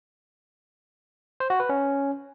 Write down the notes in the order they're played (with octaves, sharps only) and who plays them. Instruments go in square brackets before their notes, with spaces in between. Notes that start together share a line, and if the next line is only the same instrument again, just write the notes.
[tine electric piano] C5
F#4
B4
C#4